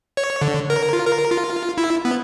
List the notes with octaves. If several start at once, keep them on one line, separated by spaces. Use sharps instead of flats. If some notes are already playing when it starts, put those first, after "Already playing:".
C#5
D3
A#4
F4
A#4
F4
E4
B3